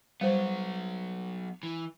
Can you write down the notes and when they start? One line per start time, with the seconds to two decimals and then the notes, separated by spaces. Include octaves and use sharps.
0.21 F#3 G3 B3 C5
1.63 E3